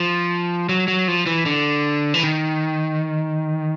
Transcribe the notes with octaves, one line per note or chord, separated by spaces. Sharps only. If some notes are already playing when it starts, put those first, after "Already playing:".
Already playing: F3
F#3
F#3
F3
E3
D3
E3
D#3